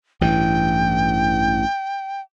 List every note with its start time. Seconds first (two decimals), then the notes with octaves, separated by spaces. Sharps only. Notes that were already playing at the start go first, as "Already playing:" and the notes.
0.21 A1 G2 E3 G5